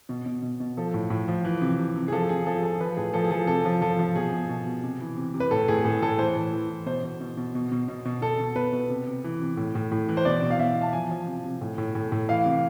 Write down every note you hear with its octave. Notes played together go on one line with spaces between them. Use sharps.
B2
B2
B2
B2
F3 A4
A2
A2
F3
E3
C3
C3
C3
G#4
F3 A4
C3 G#4
F3 A4
G#4
F3 A4
F3 B4
A2 G#4
F3 A4
G#4
F3 A4
C3 A4
F3
F3 A4
F3
B2 G#4
B2
B2
B2
C3
E3
C3
C3
B4
A2 A4
A2 G#4
A2 A4
A2 A4
E3 C5
A2
E3
E3
B2 C5
B2
B2
B2
B2
B2
B2
B2
B2 A4
B2
B2 B4
B2
C3
C3
E3
C3
A2
A2
A2
E3
C5
B2 D5
B2
F5
B2 E5
B2
A5
F3 G#5
F3
C3
C3
A2
A2
A2
A2
E3 F5
C3